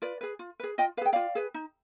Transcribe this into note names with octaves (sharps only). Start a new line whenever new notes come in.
F4 B4 D5
G#4 B4
F4
G#4 B4
F4 D#5 G5
G#4 B4 F5 G5
F4 D5 F5
G#4 B4
D#4